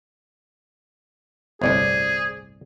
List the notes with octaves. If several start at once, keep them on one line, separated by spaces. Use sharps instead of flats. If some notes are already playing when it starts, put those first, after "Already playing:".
G1 C2 A2 G#4 C5 D5